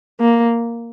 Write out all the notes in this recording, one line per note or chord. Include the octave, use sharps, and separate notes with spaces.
A#3